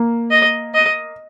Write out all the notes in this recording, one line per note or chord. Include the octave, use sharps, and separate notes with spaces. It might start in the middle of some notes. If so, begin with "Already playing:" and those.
Already playing: A#3
D#5
D#5